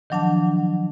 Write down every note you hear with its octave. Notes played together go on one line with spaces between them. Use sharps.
D#3 F3 F#3 D4 F#5 A5